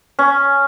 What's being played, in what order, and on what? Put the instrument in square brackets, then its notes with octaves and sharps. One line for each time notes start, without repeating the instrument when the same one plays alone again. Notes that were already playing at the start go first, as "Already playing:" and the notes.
[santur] C#4